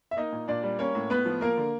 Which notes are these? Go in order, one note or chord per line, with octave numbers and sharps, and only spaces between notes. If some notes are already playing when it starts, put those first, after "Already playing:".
E5
A#3 D#4 D#5
A#2
A#2 D4 D5
G3
A#3 C#4 C#5
A2
A2 B3 B4
F3
A#3 A#4
D3